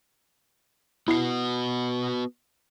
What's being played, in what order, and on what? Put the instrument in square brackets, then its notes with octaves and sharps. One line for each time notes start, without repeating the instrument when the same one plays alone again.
[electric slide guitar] B3 F#4 [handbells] E4 C7